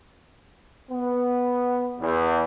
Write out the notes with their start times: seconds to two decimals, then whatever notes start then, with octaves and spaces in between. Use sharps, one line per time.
0.91 B3
2.00 E2